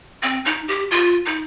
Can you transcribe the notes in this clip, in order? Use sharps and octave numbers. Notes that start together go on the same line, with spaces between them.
C4
D#4
G4
F4
D#4